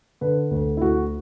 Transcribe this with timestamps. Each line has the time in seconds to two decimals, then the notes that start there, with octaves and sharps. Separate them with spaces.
0.21 D3 B4
0.51 D2
0.77 E4
0.81 D2 F#4